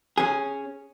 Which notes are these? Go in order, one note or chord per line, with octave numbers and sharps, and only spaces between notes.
C#4 G#4